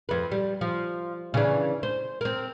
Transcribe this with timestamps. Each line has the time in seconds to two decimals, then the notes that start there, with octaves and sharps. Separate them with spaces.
0.09 F2 B4
0.32 G3
0.61 F3
1.34 C#3 E3 D4
1.83 C5
2.21 C4 A#4